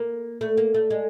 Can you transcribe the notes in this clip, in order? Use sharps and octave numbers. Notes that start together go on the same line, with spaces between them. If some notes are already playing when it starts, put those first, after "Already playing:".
Already playing: A#3
A3
A#3
A3
G#3